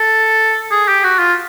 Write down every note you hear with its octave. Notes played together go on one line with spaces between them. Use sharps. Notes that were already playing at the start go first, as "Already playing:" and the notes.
Already playing: A4
G#4
G4
F#4
F4